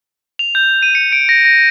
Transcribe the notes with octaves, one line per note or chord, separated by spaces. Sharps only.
F7
G6
D#7
C#7
D7
A#6
A#6